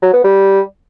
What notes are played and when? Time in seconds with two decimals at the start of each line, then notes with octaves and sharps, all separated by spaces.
0.02 F#3
0.13 B3
0.24 G3